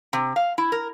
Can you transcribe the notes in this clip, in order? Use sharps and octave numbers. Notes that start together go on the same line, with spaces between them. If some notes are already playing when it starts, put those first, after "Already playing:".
C3
F5
E4
A#4